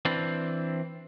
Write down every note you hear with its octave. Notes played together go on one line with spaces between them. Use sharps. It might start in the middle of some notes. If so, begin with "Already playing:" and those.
E3 C4 D4